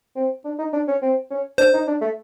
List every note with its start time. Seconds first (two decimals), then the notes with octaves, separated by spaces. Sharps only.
0.16 C4
0.45 D4
0.59 D#4
0.73 D4
0.88 C#4
1.02 C4
1.30 C#4
1.58 D4 C5
1.74 D#4
1.87 D4
2.01 A3